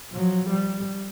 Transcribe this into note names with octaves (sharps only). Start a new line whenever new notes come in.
F3 F#3
G3